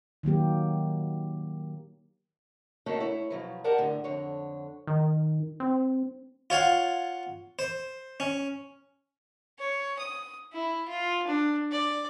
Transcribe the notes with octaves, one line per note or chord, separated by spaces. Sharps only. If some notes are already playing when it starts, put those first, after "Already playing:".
D#3 F#3 A#3 G4
A3 A#3 C#4 D#4 F#4 A4
E4 C#5
B2 F3 F#3
G4 A#4 D5 F#5 A5
A2 D3
F2 D3 C#5
D#3
C4
F4 C#5 F5 F#5
C5
C#4
C#5
D#6
E4
F4
D4
D5